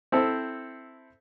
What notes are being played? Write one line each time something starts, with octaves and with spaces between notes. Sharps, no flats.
C4 E4 A4 C5